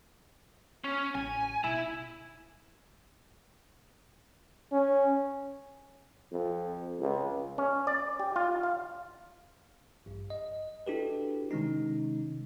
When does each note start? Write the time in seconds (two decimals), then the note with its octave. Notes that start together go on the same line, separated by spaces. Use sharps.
0.84 C#4
1.15 A1 G#5
1.64 B2 E4
4.72 C#4
6.32 F2
7.00 C#2
7.58 C#4
7.87 D5
8.19 G4
8.36 F4
8.63 F5
10.06 A1 G2
10.30 D#5
10.87 D4 E4 F#4 G4 A4 B4
11.51 C3 D#3 G#3 C#4 D#4